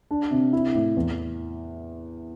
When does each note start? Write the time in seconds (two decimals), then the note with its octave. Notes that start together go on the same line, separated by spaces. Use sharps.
0.11 D4
0.31 C3
0.53 E4
0.75 A2
0.97 E2